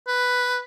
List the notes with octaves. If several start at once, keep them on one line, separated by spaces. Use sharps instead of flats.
B4